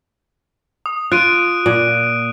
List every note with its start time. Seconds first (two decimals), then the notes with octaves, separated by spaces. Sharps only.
0.86 D#6
1.12 F4 F#6 D7 D#7
1.66 A#2